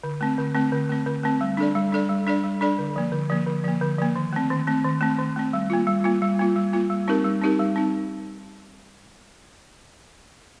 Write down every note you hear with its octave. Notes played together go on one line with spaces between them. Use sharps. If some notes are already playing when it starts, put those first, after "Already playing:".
D3
A3 C4
D3
A3 C4
D3
A3 C4
D3
A3 C4
G3
D4 A4 D5
G3
D4 A4 D5
G3
D4 A4 D5
G3
D4 A4 D5
D3
F3 A#3
D3
F3 A#3
D3
F3 A#3
D3
F3 A#3
D#3
A3 C4
D#3
A3 C4
D#3
A3 C4
D#3
A3 C4
G3
A#3 F4
G3
A#3 F4
G3
A#3 F4
G3
A#3 F4
G3
C4 D#4 G4 A#4
G3
C4 D#4 G4 A#4
G3
C4 D#4